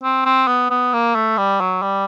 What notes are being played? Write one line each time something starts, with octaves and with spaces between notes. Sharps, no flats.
C4
C4
B3
B3
A#3
A3
G3
F#3
G3